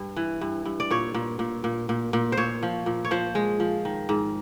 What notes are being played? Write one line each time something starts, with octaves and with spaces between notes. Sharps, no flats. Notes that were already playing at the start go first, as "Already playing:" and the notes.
Already playing: G2
E3
G2
G2
D5
A#2 C#5
A#2
A#2
A#2
A#2
A#2
C5
A#2 C#5
F3
A#2
C#5
F3 C5
G#3
F3
D#3
G#2